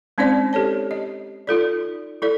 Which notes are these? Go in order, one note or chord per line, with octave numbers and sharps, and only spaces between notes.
G#3 C4 C#4 D#4 C5 D5
G4 A4 C#5 A5
D#5
D#4 F4 A4 D5
E4 A4 D5